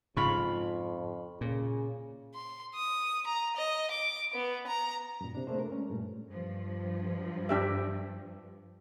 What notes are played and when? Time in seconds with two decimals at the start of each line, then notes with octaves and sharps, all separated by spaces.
0.17 F2 G#2 C#3 F4 B5 C#6
1.41 A#2 C#3
2.34 C6
2.74 D#6
3.27 A#5
3.56 D#5
3.91 D6
4.34 B3
4.67 A#5
5.21 F#2 A#2
5.35 C3 D4
5.47 A3 A#3 C4 D4 G#4 C5
5.60 A#4
5.72 G#3 C#4
5.90 G2 A#2 A3
6.30 G2 F3
7.49 D4 G4 E5